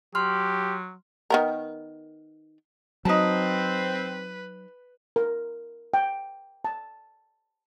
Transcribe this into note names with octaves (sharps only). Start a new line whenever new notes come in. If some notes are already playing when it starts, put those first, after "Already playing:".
F#3 G4 C6 F6
D#3 B3 A#4
F#3 C4 D#4 B4 A5
A#4
G5
A5